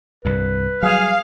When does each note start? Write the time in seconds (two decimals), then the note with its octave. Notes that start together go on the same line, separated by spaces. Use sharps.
0.25 C2 G2 B4
0.83 F#3 G3 G#4 F5